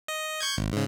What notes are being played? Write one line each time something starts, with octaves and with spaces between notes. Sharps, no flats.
D#5
C#6 G6 G#6
G#1
G#2 C#3